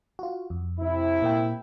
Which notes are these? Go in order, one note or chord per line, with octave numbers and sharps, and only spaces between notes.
F4 F#4
F2
C3 E4
A#2 A#3 G5